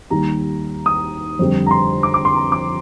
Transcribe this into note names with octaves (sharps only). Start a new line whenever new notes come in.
D#2 D#3 G3 A#5
D#6
F2 D3 G3
A#5
C6
D6
D6
C6
A#5
D6